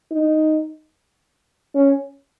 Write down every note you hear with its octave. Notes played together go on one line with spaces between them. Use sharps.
D#4
C#4